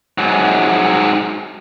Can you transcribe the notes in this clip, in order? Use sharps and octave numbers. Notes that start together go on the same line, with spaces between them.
G#2 F#3